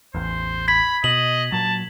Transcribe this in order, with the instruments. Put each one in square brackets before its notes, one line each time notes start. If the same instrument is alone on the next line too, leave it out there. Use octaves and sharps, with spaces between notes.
[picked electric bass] A1 E2 [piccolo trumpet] C5
[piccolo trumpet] B5 [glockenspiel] G#6 B6
[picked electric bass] B2 [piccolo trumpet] D#5 [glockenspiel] F#7
[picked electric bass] A#2 F#3 [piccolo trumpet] A5